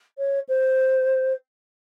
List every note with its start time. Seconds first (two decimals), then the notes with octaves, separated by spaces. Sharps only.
0.18 C#5
0.48 C5